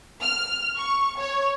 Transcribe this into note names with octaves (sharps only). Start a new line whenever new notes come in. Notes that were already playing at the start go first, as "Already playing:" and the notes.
F6
C#6
C#5